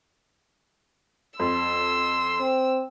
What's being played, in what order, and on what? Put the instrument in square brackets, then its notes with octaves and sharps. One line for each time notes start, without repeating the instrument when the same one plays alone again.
[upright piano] F2 [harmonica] C6 [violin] E6
[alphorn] C4